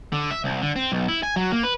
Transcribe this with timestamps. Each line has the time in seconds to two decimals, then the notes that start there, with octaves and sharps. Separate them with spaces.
0.12 D3
0.31 E5
0.44 C2
0.62 D3
0.76 C4
0.92 B1
1.08 E4
1.23 G#5
1.36 F#3
1.52 A#3
1.63 B4